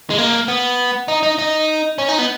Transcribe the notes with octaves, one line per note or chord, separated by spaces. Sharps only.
G#3
A#3
B3
D#4
D#4
D#4
C#4
D#4
B3